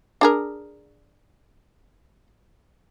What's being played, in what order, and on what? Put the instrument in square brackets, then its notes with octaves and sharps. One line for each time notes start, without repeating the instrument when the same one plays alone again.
[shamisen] D4 G#4 A#4